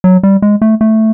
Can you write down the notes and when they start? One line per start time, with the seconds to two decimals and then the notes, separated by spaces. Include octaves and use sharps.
0.04 F#3
0.23 G3
0.42 G#3
0.62 A3
0.81 A3